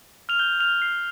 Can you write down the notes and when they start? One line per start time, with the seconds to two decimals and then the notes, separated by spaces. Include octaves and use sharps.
0.29 F6 F7
0.39 G6 G7
0.60 F6 F7
0.82 C7